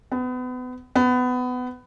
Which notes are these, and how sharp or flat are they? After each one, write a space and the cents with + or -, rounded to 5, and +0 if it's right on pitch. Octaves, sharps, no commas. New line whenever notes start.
B3 +30
B3 +20